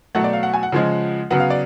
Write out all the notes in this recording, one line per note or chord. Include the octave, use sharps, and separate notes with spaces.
B2 F#3 A3 F#5
D5
F5
F#5
G#5
F#5
C#3 F3 G#3
C#3 F#3 B3 F#5
F5
D5